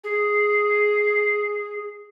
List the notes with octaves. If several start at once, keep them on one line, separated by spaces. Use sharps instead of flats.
G#4